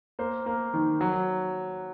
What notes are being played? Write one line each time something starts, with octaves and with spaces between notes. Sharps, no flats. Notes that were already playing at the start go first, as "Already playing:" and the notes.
A#3 C5
A#3
D#3
F#3